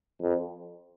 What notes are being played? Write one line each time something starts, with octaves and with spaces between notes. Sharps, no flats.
F2